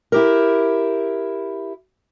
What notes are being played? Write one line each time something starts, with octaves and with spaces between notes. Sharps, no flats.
E4 G4 A#4